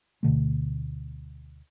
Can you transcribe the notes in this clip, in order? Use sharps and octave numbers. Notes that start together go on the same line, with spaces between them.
D2 B2 D3 A3